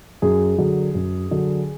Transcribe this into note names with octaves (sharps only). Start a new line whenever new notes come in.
F#2 G#4
D3 F#3
F#2
D3 F#3